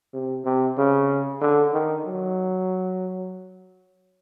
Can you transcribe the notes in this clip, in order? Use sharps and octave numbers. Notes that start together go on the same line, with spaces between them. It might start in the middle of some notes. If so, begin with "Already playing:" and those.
C3
C3
C#3
D3
D#3
F#3